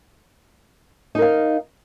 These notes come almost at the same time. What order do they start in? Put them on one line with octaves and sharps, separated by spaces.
D#4 A#4 F5